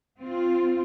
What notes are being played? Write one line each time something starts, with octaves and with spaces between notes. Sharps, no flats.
C4 F4